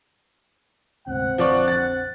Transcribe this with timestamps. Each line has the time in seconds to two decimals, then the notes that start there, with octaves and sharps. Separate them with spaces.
1.08 D2 G#2 C3 C4 F#5
1.38 A#1 F2 D3 F3 D5 C#6
1.68 A6